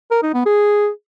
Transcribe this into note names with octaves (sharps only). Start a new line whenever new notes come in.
A#4
D#4
B3
G#4